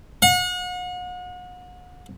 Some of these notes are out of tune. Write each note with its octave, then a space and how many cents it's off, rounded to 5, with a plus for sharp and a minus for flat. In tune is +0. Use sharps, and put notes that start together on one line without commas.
F#5 -40